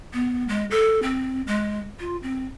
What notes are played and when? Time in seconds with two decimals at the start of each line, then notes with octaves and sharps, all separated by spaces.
0.13 B3
0.48 G#3
0.71 A4
1.02 C4
1.47 G#3
2.00 F4
2.23 C4